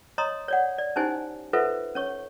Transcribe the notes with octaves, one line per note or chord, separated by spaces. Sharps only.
C#5 D#5 A#5 C6 D#6
C#5 D5 F#5
D5
C#4 D#4 E4 G4 C5 G#5
F4 A4 B4 C5 E5 F#5
C#4 C#5 C#6